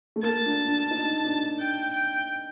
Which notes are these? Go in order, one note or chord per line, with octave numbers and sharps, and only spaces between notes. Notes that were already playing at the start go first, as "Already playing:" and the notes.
A3
A#3 A5
D4
D4
D#4
D4
G5
G5